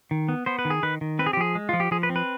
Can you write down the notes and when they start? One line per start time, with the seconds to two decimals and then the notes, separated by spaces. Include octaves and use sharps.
0.11 D#3
0.29 B3
0.46 B3 C5
0.59 B4
0.65 D#3
0.70 G#4
0.83 D#3 B4
1.01 D#3
1.19 C4 B4
1.26 G#4
1.33 G4
1.37 F3 G#4
1.55 G#3
1.69 F3 F4
1.80 G4
1.91 F3 G#4
2.03 B4
2.09 C4
2.16 B4